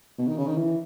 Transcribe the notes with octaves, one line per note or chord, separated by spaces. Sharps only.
B2
D#3
C#3
D#3
E3